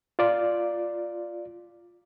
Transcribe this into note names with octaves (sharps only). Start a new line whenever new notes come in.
F4 D5